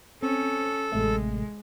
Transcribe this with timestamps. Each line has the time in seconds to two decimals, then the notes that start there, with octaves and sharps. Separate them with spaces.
0.23 C4 C#4 A4
0.92 A1 C3 G#3 A3